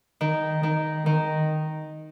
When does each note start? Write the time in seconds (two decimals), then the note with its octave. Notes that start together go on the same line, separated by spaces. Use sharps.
0.21 D#3
0.63 D#3
1.06 D#3